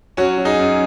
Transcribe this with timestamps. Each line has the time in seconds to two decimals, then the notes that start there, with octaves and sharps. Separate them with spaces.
0.17 F#3 C#4 F#4
0.38 F#3
0.45 D#4 G#4
0.59 F#2